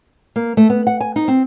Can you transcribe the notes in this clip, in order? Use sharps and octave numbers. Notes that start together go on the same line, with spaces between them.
A#3
A3
B3
F#5
G#5
D#4
C4